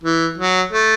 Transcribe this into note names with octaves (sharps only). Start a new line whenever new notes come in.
E3
F#3
A3